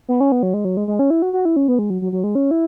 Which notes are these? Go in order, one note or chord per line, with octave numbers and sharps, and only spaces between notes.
B3
C#4
B3
F#3
G#3
F#3
G#3
G#3
C#4
E4
F#4
F#4
E4
C#4
B3
G#3
F#3
F#3
F#3
G#3
C#4
E4